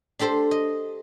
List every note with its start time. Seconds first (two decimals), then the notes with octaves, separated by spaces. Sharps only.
0.19 D4 G4 A4 C5 G5
0.51 D#5